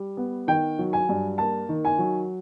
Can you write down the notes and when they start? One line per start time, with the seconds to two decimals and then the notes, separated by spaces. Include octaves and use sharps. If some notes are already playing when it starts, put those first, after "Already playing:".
Already playing: G3
0.17 B3
0.47 D#3 G5
0.79 F#3
0.93 G#5
1.09 G2
1.38 A#3 A5
1.69 D#3
1.85 G#5
1.99 F#3